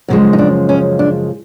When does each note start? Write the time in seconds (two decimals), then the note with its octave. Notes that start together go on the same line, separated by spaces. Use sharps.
0.08 F#2 C#3 F3 G#3
0.33 D#4
0.38 D4
0.69 C#4
0.99 D4